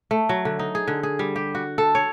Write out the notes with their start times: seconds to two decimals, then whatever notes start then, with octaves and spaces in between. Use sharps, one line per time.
0.11 A3
0.29 F#3
0.45 D3
0.59 D#4
0.75 G#4
0.88 D3
1.03 G#4
1.19 G3
1.36 G4
1.55 F#4
1.78 A4
1.95 C#5